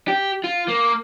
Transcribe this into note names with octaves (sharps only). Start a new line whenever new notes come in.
G4
F4
A#3